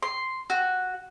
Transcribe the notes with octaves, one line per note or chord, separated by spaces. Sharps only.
C6
F#4